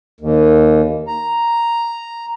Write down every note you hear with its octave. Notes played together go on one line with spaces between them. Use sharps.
D#2
A#5